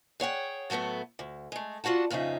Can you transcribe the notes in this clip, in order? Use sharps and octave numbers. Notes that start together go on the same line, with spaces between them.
G#4 C#5 F#5 G5
A2 F#3 A3 B3 A4
D2
G#3 A3
D4 F4 F#4 F#5 A5
F2 A#2 C#3 D#4 E5